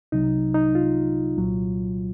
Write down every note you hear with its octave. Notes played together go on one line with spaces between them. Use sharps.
C2 C3 F#3 D#4
D#4
F4
C2 A#2 F#3